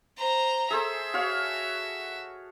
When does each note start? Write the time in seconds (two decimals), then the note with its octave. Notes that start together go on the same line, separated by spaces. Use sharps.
0.18 C5 A#5
0.70 G#4 A4 C5 E5
1.14 F#4 C#5 F5